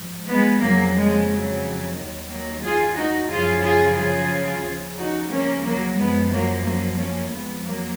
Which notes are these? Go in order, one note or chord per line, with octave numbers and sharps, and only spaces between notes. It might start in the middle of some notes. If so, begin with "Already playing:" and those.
Already playing: G#2 F3
G#3 B3
F2 C#3 F3 F#3 A#3
F3 G#3
F#3
D#2 D#3 F#3
F#3 A#3
F4 G#4
D#4 F#4
F#2 C#3 F3 F4 G#4
F4 G#4
F4 G#4
D#2 C#3 F3
D#4 F#4
A#3 C#4
F#3 A#3
F#2 F3 G#3 B3
F#3 A#3
F#3 A#3
A#3 C#4
F2 F3 G#3 B3
F#3 A#3